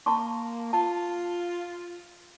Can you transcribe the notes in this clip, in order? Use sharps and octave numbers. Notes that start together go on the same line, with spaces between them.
A#3 A5 C6 C#6
F4 A5